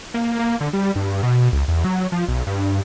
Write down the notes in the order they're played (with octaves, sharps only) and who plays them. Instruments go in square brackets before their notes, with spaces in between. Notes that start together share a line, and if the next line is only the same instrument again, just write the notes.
[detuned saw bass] A#3
A#3
D3
G3
G2
B2
C#2
E2
F#3
F3
B1
G2